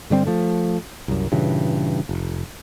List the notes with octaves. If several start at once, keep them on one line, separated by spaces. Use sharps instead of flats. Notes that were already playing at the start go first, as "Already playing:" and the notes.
G2 D3 G3 C4
F3 A3
C2 F#2
G2 A#2 C#3 E3
F1